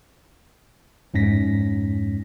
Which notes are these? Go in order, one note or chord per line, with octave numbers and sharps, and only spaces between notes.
F2 G#2 C#4 A#6 B6